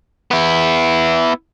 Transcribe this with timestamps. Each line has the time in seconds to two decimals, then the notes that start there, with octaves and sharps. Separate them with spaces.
0.31 B3 E4